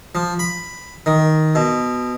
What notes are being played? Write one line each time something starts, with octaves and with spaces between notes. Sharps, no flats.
F3
B5
D#3
B2